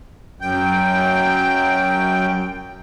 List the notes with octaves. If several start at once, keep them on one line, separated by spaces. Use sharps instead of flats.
F#2 G5